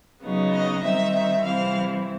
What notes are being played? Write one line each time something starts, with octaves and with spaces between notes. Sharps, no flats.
C#3 F#3 B3 D#4
D#5
D#3 G3 C4 D#4 E5
E5
C3 E3 G3 C4 E4 F5